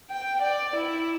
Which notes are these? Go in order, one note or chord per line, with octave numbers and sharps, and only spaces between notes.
G5
D5
E4